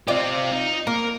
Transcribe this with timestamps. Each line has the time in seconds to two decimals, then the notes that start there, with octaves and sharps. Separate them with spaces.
0.08 C4 F4 G4 D5 D#5
0.51 D#4
0.87 A#3 A#4